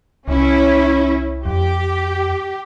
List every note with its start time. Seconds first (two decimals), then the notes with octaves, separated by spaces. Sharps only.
0.28 C2 C#4 E4
1.46 F2 G4